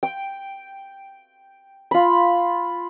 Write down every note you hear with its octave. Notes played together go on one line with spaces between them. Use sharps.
G5
F4 B5